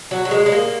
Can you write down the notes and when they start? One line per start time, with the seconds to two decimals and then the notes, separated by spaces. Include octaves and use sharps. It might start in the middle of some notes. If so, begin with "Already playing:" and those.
0.11 F#3
0.25 F#3
0.31 G#3
0.46 G#3
0.52 A#3